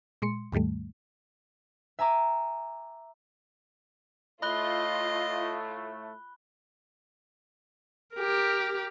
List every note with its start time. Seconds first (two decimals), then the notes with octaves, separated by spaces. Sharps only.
0.22 A#2 G#3 C6 C#7
0.52 D#2 G#2 D#3 G3 A3
1.99 E5 G#5 A#5 D6
4.42 A2 A3 F4 D#5 B5 F#6 G7
8.15 G4 A#4